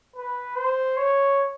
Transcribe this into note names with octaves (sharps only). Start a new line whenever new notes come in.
B4
C5
C#5